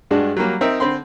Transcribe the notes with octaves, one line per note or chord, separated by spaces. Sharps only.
G2 G#3 D4 F#4
F#3 G3 A#3
C4 D#4 A#4 E5 A#5
D3 C4 B5 C6